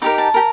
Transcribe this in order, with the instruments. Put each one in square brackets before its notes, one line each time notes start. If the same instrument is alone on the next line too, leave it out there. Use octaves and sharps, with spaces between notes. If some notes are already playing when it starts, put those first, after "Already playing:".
[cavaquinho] D#4 G4 A#4 D6
A5
G4 A#4